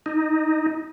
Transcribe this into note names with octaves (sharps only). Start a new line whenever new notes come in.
D#4